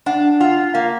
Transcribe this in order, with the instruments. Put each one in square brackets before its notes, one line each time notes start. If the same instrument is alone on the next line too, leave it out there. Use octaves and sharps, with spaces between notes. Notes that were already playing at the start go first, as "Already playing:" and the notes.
[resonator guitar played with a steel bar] D4 [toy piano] F#5
[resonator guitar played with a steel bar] F4 [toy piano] F#5
[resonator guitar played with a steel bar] A#3 [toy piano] F5